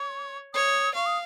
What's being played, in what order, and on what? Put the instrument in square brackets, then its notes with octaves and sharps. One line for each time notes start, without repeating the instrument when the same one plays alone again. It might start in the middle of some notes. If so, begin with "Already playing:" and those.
Already playing: [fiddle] C#5 [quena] C#6
[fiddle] C#5 [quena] D#6
[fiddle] F5 [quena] C#6
[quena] D#6